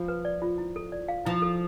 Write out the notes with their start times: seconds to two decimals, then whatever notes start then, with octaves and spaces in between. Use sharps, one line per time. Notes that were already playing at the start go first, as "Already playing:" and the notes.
Already playing: F3 F4
0.08 B4
0.25 D5
0.42 F4
0.58 E4
0.76 A4
0.92 D5
1.08 F5
1.26 F3 E4
1.42 A4